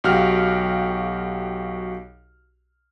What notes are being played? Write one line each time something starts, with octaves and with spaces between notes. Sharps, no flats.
B1 F#4 G4 F5 F6